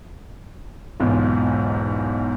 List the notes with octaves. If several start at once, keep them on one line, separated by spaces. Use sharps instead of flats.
B1 E2 G#2 F4